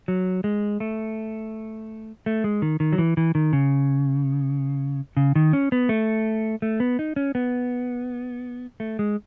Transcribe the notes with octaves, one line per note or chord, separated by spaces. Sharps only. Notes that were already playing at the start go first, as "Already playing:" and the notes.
F#3
G#3
A3
A3
G#3
D#3
D#3
F#3
E3
E3
D#3
C#3
C#3
D#3
C#4
B3
A3
A3
B3
D#4
C#4
B3
A3
G#3